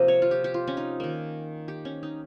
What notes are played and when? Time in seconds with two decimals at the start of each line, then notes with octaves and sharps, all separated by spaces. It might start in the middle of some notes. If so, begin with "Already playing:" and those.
Already playing: C3 F3 A#3 D#5
0.08 C#5
0.22 F4
0.31 G4
0.44 G4
0.54 F4
0.67 C#4
0.77 D#4
1.00 D#3 A#3
1.68 G4
1.85 C#4
2.03 D#4